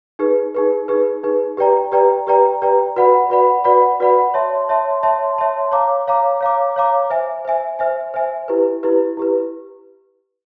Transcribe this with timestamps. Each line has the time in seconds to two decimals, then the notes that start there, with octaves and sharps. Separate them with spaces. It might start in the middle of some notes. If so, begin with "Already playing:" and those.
0.19 D#4 G#4 B4
0.55 D#4 G#4 B4
0.88 D#4 G#4 B4
1.23 D#4 G#4 B4
1.57 G4 B4 D5 G5 A#5
1.92 G4 B4 D5 G5 A#5
2.27 G4 B4 D5 G5 A#5
2.62 G4 B4 D5 G5 A#5
2.96 F#4 B4 D5 F#5 B5
3.30 F#4 B4 D5 F#5 B5
3.64 F#4 B4 D5 F#5 B5
4.00 F#4 B4 D5 F#5 B5
4.34 C#5 E5 A5 C6
4.69 C#5 E5 A5 C6
5.03 C#5 E5 A5 C6
5.38 C#5 E5 A5 C6
5.72 C#5 F5 A#5 D6
6.07 C#5 F5 A#5 D6
6.41 C#5 F5 A#5 D6
6.76 C#5 F5 A#5 D6
7.10 C5 E5 G#5
7.45 C5 E5 G#5
7.79 C5 E5 G#5
8.14 C5 E5 G#5
8.48 E4 G4 B4
8.83 E4 G4 B4
9.17 E4 G4 B4